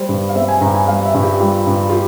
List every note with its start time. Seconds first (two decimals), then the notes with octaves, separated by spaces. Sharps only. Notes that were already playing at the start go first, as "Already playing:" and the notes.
Already playing: G3 C5
0.09 G2
0.29 F5
0.35 C4 E5
0.48 G#5
0.61 G2 A#5
0.74 G#5
0.87 G3 F5
1.05 E5
1.14 G2
1.23 G4
1.40 G3 F4
1.67 G2
1.89 F4
1.92 G4